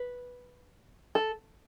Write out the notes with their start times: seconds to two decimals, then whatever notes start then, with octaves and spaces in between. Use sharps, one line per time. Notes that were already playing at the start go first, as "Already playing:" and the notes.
Already playing: B4
1.15 A4